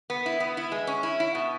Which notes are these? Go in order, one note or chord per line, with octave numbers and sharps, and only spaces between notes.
B3
E4
B3
E4
G#3
C#4
E4
E4
B2